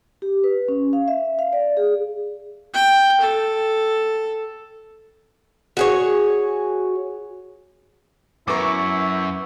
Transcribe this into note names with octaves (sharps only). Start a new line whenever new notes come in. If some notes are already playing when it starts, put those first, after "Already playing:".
G4
B4
C#4
F5
E5
F5
D5
G#4
G5
A4
F#4 G#4 C#5
F#2 B3 E4 A#4 C#6 D6